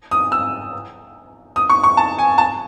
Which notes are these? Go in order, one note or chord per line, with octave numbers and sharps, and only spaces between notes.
D#6
E6
D#6
C#6
C#6
A5
G#5
A5